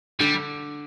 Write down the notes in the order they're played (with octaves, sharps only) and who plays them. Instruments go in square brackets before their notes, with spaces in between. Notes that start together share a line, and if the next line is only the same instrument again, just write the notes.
[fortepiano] D3 [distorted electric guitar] G3